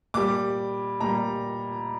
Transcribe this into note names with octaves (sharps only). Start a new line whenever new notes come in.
A#2 G3 D6
A#2 G3 A#5